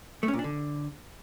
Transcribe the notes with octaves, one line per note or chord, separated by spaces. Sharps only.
A3
C#4
A#2
D4
D3